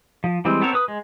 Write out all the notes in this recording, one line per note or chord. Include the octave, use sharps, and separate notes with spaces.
F3
E3 G3 G#3 C4
B3 C4 A4 A#4 C#5
B4 D#6
G#3